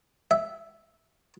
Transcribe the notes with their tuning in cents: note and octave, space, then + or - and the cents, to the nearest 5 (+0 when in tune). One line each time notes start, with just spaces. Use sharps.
E5 +0